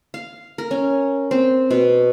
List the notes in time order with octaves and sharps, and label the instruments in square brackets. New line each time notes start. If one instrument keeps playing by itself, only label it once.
[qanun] F5
A#4
C#4
C4
B2